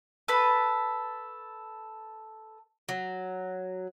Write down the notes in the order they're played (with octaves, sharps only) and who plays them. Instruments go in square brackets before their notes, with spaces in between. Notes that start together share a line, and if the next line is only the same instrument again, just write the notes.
[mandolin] A4 B4
[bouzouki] F#3